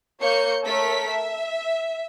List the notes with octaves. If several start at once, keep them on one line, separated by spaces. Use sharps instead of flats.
A#3 C#5 G6 C#7
A3 A4 A#4 C#5 B6
E5